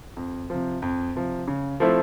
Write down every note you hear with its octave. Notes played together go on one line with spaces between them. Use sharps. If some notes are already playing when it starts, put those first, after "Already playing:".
F2
C3 F3
F2
C3 F3
C#3
F3 A3 C4 E4